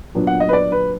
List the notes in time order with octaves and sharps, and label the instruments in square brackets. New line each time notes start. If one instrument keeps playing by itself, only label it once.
[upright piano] A#2 F#3 B3 D4
F#5
D#5
B4
D5
B4